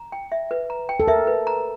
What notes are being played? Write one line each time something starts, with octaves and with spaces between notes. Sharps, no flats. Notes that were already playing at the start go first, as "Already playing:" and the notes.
Already playing: A#5
G5
E5
B4
A#5
G5
A4
A#4 E5
B4
A#5